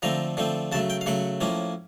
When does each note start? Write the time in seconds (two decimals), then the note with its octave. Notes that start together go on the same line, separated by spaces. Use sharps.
0.02 D3 F3 A3 C4 A#5
0.37 D3 F3 A3 C4
0.72 C#3 F#3 A3 A5
0.90 G5
1.01 F5
1.06 C#3 F#3 A3 F#5
1.41 A2 F3 A#3 C#4